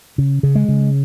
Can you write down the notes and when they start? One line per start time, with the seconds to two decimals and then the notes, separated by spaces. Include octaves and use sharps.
0.18 C#3
0.43 C#3
0.55 G#3
0.68 C#3